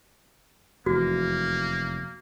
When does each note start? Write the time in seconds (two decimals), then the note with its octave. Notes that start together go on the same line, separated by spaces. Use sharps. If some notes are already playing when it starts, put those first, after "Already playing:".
0.86 F1 E2 A#3 F#4